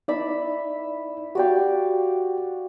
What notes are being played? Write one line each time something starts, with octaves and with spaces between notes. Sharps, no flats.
D#4 E4 D5 E5 B5
F#4 G4 D5 F5 G5